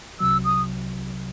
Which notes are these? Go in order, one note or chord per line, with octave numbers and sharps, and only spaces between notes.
C2 C3 F#3 E6
D#6